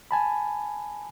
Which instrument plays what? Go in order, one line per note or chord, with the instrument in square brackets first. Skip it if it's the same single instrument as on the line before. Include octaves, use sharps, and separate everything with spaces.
[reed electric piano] G#5 A5 B5